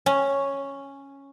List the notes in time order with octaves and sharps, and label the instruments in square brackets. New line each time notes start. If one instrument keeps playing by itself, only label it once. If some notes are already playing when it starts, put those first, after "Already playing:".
[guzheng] C#4